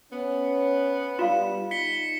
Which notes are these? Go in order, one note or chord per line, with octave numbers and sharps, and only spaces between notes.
B3 C#4
G3 F4 F5 E7
D#4 B6 C#7 G7